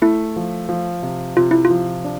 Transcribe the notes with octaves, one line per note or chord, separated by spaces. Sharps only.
A3 E4
F3
F3
C3
C3 F4
E4
F4
F3
D4